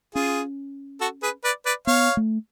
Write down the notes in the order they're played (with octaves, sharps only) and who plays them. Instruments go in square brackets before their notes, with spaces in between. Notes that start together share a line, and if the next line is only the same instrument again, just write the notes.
[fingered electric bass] C#4 [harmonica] F4 G#4
[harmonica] F#4 A4
G#4 B4
B4 D5
B4 D5
[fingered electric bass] B3 [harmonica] C#5 F5
[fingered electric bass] A3